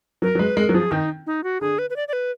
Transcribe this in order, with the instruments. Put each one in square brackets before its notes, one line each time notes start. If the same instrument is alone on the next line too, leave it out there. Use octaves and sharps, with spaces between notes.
[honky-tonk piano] F#3 [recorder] A#4
[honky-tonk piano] F#3
[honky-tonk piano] G#3 [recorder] B4
[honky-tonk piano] G#3 [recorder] A#4
[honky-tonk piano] F#3
[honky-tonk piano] F3 [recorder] G#4
[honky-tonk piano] D#3 [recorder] D#4
[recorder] D#4
F#4
[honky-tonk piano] D3 [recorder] G#4
[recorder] B4
B4
D5
D5
B4